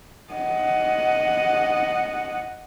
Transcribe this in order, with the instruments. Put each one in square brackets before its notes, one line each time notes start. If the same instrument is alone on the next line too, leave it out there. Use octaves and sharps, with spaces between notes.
[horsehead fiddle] D#5 F#5